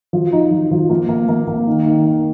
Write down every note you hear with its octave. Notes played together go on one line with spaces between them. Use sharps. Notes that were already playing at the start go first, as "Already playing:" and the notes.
F3
D#4
F3
F3
A#3
A#3
A#3
A#3
D#3
D#3
D#3